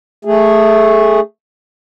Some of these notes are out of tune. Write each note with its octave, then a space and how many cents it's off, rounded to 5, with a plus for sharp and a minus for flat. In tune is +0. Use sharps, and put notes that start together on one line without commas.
A3 +0 G#4 -15